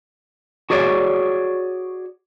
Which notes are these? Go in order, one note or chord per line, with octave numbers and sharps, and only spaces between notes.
F#4 G#4 C#5 D5